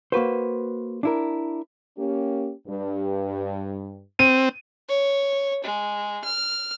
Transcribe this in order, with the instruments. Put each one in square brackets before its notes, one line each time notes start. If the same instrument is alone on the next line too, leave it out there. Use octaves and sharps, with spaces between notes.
[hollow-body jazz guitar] A#3 F#4 B4 C5
D4 E4 A#4
[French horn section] A#3 C#4 G4
G2
[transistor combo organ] C4 [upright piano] D#7
[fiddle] C#5
G#3
F6